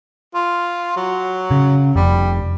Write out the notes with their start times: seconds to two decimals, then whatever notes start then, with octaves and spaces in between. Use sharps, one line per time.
0.35 F4
0.97 F#3
1.51 C#3
1.96 F1 G3